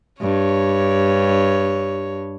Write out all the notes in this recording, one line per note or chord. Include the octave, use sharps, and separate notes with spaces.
G2 C#5